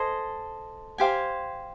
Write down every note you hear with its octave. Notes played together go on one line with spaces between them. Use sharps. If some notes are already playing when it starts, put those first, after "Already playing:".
Already playing: A4 C5 D#5 G#5
G4 C5 F5 G#5